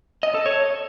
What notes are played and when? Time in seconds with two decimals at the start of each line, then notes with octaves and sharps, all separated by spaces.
0.23 D#5
0.34 A4
0.46 C#5